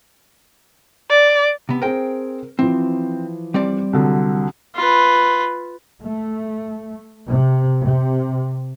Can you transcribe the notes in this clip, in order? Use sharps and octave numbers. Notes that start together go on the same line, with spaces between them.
D5
C3 B3
C4 G#4 A#4 C5 G5
E3 F3 C4
G3 C4 D5
C2 D3 F#3
F4 B4
A3
C3
C3